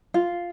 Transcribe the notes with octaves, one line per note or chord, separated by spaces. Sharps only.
F4